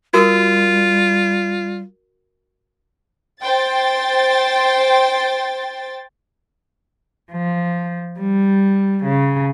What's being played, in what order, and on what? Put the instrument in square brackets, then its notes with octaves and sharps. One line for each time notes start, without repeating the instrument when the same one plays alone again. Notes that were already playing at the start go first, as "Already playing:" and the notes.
[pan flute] G3 [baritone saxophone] F4 [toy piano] F#4 A#4 D#6
[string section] C5 G5 A6
[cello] F3
G3
C#3